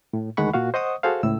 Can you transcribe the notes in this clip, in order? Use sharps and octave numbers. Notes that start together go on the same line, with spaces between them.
A2
D2 D#3 G#3 F#5 B5 C#6
A#2 F#4 F5
C5 D#5 F#5 C#6 D#6
F#4 G#4 A4 C5 F5
C#2 A2 E6